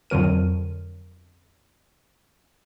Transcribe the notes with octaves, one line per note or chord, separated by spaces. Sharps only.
F2 D3 F#3 A#4 D#7